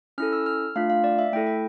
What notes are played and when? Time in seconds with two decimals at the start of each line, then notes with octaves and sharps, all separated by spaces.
0.18 C#4 E4 A4 F6
0.33 E6
0.46 F6
0.76 A3 D4 F4 F5
0.90 F5
1.04 D5
1.19 E5
1.32 A3 E4 A4 G5
1.47 G5